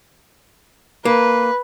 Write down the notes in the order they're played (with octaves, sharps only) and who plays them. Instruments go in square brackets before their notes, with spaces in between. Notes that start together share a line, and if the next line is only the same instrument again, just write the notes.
[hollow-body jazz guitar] A#3 [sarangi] B4